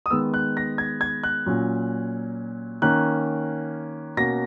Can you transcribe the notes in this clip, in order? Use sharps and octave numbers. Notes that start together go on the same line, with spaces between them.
D#6
D#3 G#3 B3 E6
F#6
A#6
G#6
G#6
F#6
A#2 F#3 C#4
D#3 A#3 C#4 F#6
B2 A#3 C#4 A#6